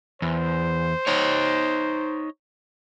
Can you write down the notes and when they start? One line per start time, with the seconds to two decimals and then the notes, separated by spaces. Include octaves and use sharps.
0.22 E2 C5
1.07 D#4 C#5